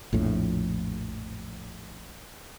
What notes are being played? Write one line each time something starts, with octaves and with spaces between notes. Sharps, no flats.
A#1 F2 A2